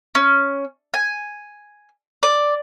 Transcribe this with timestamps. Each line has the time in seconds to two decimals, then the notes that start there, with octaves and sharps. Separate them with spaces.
0.15 C#4
0.94 G#5
2.23 D5